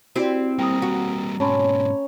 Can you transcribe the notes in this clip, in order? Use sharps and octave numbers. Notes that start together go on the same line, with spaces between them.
C4 E4 F#4 G4 D5
G3 A#3 G5 A#5 D#6
F#4
G#2 B2 C#4 A5 B5 C6